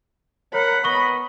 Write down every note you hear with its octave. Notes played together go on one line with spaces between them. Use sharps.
A#4 C#5 F#5 B5
B3 D#5 C#6 G7